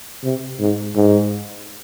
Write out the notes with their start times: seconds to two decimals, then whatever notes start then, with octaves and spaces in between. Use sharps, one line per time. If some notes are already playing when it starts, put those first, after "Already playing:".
0.24 C3
0.60 G#2
0.95 G#2